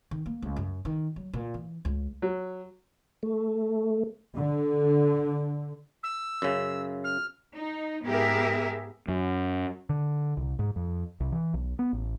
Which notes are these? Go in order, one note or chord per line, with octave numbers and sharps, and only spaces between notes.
D#3
A#3
C#2
F#2
D#3
F#3
A#2
E3
C#2
F#3
A3
D3
E6
F#2 C#3
F6
D#4
G#2 B3 G4 G#4 A#4 E5
F#2
D3
C2
G#2
F2
C2
E3
B1
B3
A1